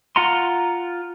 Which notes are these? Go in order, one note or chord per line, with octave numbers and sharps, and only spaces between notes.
F4 F#5 A#5 C6